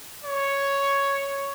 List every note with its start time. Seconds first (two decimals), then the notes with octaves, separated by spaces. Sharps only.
0.24 C#5